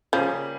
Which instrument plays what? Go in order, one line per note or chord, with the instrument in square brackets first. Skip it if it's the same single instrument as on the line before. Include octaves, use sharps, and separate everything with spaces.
[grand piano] C#3 G3 A#3 C#4 G#4 [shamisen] F3